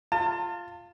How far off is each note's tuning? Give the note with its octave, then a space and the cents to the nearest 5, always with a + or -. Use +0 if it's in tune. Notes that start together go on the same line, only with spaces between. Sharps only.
F4 +0 A5 +35